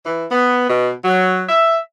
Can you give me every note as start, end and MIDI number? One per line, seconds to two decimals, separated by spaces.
0.06 0.25 52
0.32 0.67 59
0.70 0.91 47
1.05 1.44 54
1.49 1.78 76